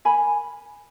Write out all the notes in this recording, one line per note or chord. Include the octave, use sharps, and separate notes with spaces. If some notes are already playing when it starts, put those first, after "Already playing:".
A#4 G#5 B5